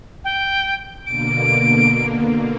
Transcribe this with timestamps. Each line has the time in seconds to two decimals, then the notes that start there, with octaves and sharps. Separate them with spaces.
0.24 G5
1.06 B2 D3 A#3 D7